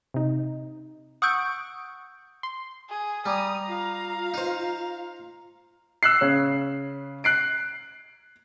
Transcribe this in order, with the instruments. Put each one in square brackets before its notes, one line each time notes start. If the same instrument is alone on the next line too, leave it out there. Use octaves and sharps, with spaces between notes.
[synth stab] C3 D#4
[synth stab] F#5 C#6 D7 [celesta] D#6 E6 G6
[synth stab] C6
[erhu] G#4
[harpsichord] G3 [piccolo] A#5 [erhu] D#6
[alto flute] F4 [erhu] F5
[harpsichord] D#4 C5
[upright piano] E6 F#6 C7
C#3 C#5
F#6 C7 D7